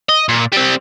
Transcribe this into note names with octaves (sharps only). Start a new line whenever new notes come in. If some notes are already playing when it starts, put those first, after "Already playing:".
D#5
A#2
G3 C4